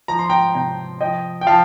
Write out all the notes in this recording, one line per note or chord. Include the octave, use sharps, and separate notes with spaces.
F3 A#5
C6
G5 A#5
C3 G5 A#5
F3 D#5 G5
G5
F3 F5 A5